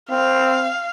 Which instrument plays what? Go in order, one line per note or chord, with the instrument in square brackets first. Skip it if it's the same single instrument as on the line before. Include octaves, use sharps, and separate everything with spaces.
[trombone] C4 [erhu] F5